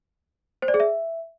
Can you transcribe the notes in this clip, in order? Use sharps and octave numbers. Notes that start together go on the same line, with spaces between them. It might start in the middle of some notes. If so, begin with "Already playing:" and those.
C5
D5
G#4
E5